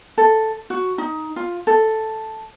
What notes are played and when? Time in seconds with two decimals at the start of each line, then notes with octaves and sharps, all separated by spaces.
0.18 A4
0.70 F#4
0.98 D#4
1.36 F4
1.67 A4